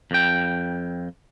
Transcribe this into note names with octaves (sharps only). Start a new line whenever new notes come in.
F2 G5